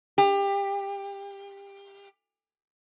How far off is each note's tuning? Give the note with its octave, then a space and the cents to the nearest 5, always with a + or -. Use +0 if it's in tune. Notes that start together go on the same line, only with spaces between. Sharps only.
G4 +25